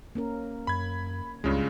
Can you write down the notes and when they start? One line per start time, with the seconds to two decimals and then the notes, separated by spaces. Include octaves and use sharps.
0.15 A#3 C#4 A#4
0.67 F#2 B5 G#6
1.44 C#2 G2 C#3 G#3 C#4 F4